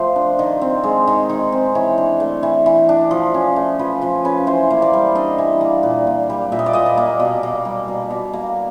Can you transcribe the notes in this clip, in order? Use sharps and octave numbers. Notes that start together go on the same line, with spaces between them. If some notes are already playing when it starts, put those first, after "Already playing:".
Already playing: F3 A3 C5
D4
D#3
C4
G#3
D#3
D#3
C4
E3 C#5
D4
A3
E3
E3
D4
F3
C#4
A3
F3 B4
F3 B4
C#4 B4
E3 C5
A#3
D5
G3
D4 D#5
E3
A#3
A#2
A#3
G3
A#2 E5
D#5
D5
A#2 D#5
D5
A#3
B2
A#3
G3
B2
B2
A#3